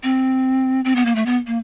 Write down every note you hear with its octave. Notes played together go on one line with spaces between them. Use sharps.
C4
C4
B3
A#3
A3
B3
A#3